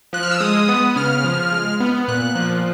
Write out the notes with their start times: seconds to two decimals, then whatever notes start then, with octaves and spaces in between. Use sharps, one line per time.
0.13 F3 F#6
0.23 F6
0.31 E6
0.40 G#3 D#6
0.68 B3
0.96 C#3 F6
1.24 F3
1.52 G#3
1.80 B3
2.08 A#2 F#6
2.35 F3